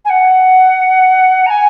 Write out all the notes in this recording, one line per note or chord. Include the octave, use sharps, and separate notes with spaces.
G#5
F#5
A#5
G#5